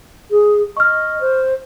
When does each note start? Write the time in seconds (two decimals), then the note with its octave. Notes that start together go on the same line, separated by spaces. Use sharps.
0.30 G#4
0.77 D#5 C#6 F6
1.21 C5